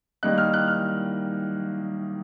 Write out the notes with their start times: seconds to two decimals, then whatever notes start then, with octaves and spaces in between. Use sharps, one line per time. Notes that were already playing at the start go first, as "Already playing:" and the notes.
0.23 D#3 G3 A#3 D#4 F#6
0.38 F6
0.54 F#6
0.68 F6